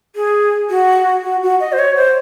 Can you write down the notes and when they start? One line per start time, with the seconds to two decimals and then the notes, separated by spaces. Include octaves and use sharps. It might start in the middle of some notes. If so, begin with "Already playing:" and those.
0.16 G#4
0.70 F#4
1.24 F#4
1.43 F#4
1.60 D#5
1.73 C5
1.79 C#5
1.96 C5